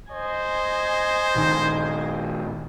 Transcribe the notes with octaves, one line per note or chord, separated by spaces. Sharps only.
C5 D#5 G#5
A#1 D#3